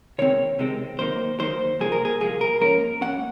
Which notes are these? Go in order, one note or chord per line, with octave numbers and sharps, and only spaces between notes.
C3 D#3 G#3 C4 C#5
C3 D#3 G#3 C4
F#2 D#3 A#3 D#4 C5
F#2 D#3 A#3 D#4 C5
C2 A#2 F3 A#3 G#4
A#4
G#4
C2 A#2 F3 A#3 G#4
A#4
G#2 F3 A#3 C#4 A#4
G#2 F3 A#3 C#4 F#5